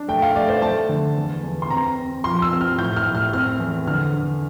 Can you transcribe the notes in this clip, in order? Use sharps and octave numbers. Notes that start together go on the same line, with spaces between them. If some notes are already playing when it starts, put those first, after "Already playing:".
Already playing: D4
A3 G5
F5
A3 D5
C5
A3 A5
D3
E2
E2
C6
C4 A#5
C4
F3 C6
E6
C4
F6
A2 G6
F6
A2
F6
C4 F6
E2
D3 F6
D3